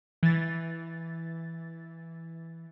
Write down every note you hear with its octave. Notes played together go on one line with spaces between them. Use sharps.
E3 A6